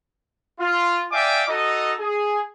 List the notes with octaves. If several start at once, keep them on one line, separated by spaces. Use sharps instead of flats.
F4
D5 E5 F5 G5 G#5 D6
D#4 F#4 A4 D#5
G#4